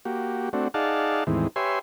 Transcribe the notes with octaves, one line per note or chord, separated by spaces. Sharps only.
A#3 F#4 G4
A3 C4 D4 F#4
D#4 G#4 D5 F5 F#5 A5
E2 A2 D#3 E3 G#3 C4
G4 B4 C#5 E5 G#5 C6